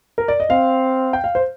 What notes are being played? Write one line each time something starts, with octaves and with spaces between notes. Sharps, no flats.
A#4
D5
D#5
C4 F5
G5
F5
C5